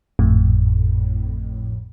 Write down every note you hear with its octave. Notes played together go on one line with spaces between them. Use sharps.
G#1 F2 A2